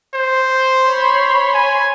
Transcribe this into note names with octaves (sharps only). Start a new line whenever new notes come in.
C5
C#5 B5 C6
G#5